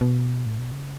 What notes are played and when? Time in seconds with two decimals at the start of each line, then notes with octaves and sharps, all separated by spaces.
0.01 B2
0.46 A2
0.59 B2
0.72 C#3